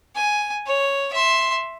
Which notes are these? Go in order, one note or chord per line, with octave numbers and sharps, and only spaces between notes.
G#5
C#5
E5 C6